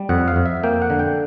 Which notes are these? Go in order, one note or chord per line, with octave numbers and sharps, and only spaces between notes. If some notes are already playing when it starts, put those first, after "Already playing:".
Already playing: G3
F2 F#5
F5
F2
E5
A#3 G5
F#5
D3
G5